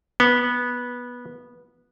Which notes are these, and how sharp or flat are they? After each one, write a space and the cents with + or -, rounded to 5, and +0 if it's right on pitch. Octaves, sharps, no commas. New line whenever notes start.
B3 -15